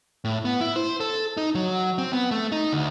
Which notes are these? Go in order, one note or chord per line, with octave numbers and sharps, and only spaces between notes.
A2
B3
E4
C5
A4
D#4
F#3
C4
B3
A3
D#4
D2